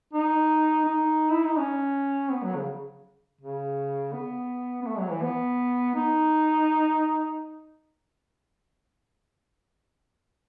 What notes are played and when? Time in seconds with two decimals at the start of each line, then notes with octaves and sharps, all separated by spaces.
0.13 D#4
0.85 D#4
1.31 E4
1.44 D#4
1.58 C#4
2.31 B3
2.43 F#3
2.56 C#3
3.41 C#3
4.13 B3
4.82 B3
4.86 A3
4.98 F#3
5.11 E3
5.22 B3
5.95 D#4